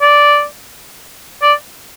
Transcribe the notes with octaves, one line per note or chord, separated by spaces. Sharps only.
D5
D5